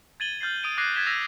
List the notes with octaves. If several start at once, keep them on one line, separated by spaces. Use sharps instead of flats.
G#6 A6 D#7 F#7 G7
F6 G6 A6 C7
D#6 D7 D#7 G7
D6 F#6 G#6 A#6 C7 D#7
G#6 A6 B6 E7 G7
E6 A#6 B6 D#7 F7